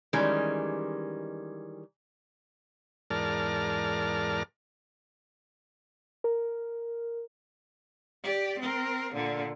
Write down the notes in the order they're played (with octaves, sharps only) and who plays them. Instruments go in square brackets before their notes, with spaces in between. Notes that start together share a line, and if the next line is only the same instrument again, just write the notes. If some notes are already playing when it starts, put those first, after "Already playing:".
[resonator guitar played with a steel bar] D#3 E3 G3 G#3 C#4
[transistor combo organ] E2 G#2 A#4 D5 A5 F6
[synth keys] A#4
[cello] G4 D5
C4 A#4
A#2 D3